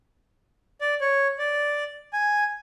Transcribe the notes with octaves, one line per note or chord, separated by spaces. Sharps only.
D5
C#5
D5
G#5